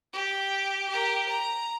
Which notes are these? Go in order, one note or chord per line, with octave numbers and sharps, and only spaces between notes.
G4
G4 A#4
A#5